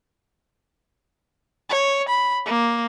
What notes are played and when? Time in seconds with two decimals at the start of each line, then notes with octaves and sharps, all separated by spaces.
1.69 C#5
2.09 B5
2.46 A#3